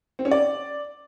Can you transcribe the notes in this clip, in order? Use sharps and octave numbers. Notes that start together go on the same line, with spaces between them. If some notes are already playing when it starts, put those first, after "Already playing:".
C4
C#4
D5